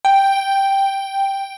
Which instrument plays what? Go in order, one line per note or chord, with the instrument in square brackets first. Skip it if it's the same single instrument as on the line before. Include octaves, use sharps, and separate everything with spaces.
[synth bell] G5